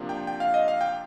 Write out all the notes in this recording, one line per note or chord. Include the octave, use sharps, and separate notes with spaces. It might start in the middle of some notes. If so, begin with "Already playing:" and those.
Already playing: C3 F3 A#3 D4
G5
G5
F5
D#5
F5
G5